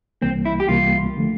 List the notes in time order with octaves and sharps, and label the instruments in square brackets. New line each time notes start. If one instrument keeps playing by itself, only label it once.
[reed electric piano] C2 C3 E3 G3 A#3 [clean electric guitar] C4
[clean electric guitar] E4
G4
[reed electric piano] C2 C3 E3 G3 A#3 [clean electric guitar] F4
[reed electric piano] D3 F3 A3